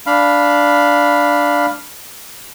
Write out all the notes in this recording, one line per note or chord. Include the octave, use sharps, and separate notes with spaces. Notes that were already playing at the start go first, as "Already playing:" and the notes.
D4 F5 B5